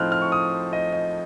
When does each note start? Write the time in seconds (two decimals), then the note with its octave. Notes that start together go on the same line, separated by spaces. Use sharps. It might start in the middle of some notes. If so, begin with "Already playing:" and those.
Already playing: A2 F3 C4 D#4 F6 F#6
0.12 F6
0.22 C#6
0.32 D#6
0.73 D#5
0.93 D#5